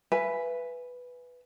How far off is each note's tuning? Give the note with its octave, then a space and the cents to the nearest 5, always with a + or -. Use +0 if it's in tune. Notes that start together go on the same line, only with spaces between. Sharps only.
B4 +0 E5 +30 G#5 +0